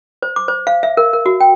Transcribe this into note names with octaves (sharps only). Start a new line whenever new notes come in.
C5
D6
C5
F5
E5
A#4
A#4
F#4
G5